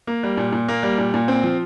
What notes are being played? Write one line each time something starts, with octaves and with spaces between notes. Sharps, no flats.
A#3
G3
A#2
A#2
A#3
G3
A#2
A#2
C4
F3